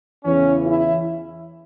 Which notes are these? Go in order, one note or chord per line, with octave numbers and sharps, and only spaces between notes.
E2 C#3 E3 C#4
E4